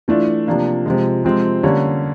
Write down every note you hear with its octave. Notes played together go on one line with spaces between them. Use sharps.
E3 A3 D4 F4
C3 F3 A#3 D4
C3 F3 G#3
C3 F3 G#3 C4
D3 G3 A#3 C#4